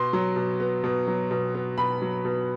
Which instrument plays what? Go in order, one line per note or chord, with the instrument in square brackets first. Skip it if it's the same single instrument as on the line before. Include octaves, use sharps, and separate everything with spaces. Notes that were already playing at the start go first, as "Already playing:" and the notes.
Already playing: [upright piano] B2 C6
F#3
B2
B3
B2
F#3
B2
B3
B2 B5
F#3
B2